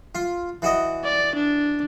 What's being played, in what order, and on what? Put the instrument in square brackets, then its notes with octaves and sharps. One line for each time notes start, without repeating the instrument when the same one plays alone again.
[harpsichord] F4
E3 F#4 D#5
[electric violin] D5
D4